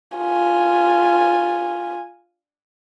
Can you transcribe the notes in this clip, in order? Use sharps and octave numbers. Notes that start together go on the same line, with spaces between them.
F4 G#5